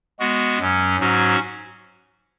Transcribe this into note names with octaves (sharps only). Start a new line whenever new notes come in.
G#3 B3 F#4
F#2 F#3 C#4
G#2 F#3 C#4 F#4